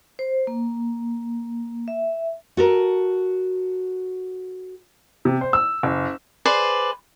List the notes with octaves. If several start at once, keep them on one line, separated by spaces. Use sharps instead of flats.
C5
A#3
E5
F#4 A4 A#4
C3
C5
E6
F#1
G#4 B4 C5 D5